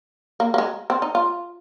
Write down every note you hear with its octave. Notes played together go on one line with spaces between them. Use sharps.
A#3
A#3
G#3
C4
D#4
F4